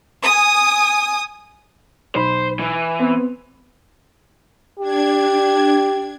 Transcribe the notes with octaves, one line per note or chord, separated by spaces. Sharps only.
G#5 D#6
B1 C5 B5
E3
B3 C4
D4 G4 G#6